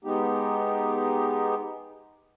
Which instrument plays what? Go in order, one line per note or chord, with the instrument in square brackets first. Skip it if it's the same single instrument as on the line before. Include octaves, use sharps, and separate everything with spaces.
[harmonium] G#3 B3 D#4 G4